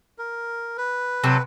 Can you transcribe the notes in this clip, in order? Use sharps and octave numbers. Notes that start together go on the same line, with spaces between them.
A#4
B4
C3 F#3 A4